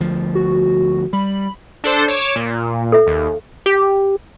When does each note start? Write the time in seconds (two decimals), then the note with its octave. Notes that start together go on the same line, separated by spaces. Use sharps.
0.01 D2 F3
0.35 F#4
1.13 G3 B5
1.84 D4 A4 C5
2.08 C#5 D6 E7
2.36 A#2
2.92 A4 E5
3.07 D#2
3.66 G4